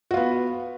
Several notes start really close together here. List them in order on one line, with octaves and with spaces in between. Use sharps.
F#4 F4 B3